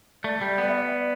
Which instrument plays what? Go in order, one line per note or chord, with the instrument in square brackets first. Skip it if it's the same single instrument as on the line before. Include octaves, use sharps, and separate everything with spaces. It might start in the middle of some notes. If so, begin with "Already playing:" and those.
[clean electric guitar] A3 [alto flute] D5
[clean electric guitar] G3
B3
[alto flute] E5
D5